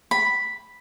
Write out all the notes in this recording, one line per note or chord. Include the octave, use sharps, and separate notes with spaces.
B5